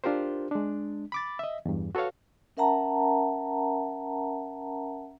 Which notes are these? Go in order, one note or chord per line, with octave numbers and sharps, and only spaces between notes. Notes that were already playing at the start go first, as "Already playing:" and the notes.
D4 F4 G4 A#4 C5
G#3 D4
B5 D6 A6
D#5 E5
E2 G2
F#4 A4 B4 C#5 F5
C#4 A#4 E5 F#5 A5 A#5